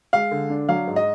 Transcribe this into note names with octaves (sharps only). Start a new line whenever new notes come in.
G#3 F5
D3
D4
F#3 F5
G#2
D#5